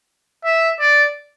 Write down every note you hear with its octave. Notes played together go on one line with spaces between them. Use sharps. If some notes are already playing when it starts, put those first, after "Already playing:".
E5
D5